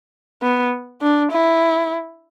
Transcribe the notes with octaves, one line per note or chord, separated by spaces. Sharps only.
B3
D4
E4